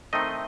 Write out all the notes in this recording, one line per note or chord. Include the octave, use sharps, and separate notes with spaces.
D#3 A3 C4 D#4 D#5